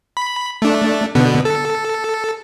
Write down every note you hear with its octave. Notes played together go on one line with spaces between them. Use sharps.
B5
A3 D4
B2 D3 B3
A4